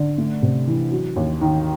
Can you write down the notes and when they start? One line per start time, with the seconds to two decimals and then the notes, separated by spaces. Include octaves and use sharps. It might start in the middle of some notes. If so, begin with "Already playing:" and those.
Already playing: D3
0.18 A3
0.42 C3
0.67 E3
0.92 F#3
1.16 D#2
1.41 D#3